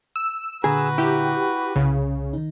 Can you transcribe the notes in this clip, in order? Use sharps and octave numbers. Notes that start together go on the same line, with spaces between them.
E6
A#2 D3 F#4 G#4 B4 A#5
E4 G4
C2 C#3
D#3 D#4